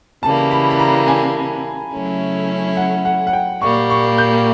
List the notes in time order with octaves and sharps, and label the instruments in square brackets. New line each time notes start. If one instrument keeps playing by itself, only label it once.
[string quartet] C#3 E3 G3 A#3 [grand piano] A5
[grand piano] B5
B5
A#5
G#5
[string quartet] C#3 F#3 A3 C#4 E4
[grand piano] F#5
F#5
F#5
G5
[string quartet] A#2 G3 A#3 [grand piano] C#6
[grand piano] C#6
G6